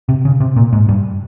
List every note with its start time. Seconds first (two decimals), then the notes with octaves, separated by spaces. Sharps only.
0.09 C3
0.25 C#3
0.40 C3
0.56 A#2
0.73 G#2
0.89 G2